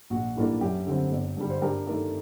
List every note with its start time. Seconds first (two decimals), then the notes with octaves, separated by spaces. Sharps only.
0.10 A#1 F#4
0.36 A2 G3 A#3 D4
0.61 F#2 G4
0.87 D3 G3 C4
1.11 G1
1.37 G2 D3 G3
1.50 C5
1.62 G2 G4 A#4
1.87 D#3 A3 A#4 D5